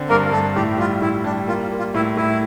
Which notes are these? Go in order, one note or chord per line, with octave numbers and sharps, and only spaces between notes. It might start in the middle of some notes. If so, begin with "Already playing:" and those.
Already playing: D3 C4
G2 A#3 A#4
G2 A3 A4
A2 G4
G3 F4
A2 E4
G3 D4
A#3 F4
A#3
F4
A2 E4
A2 E4